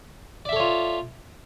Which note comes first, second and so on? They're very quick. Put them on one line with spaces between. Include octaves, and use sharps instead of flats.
D5 E5 A4 C#5 F4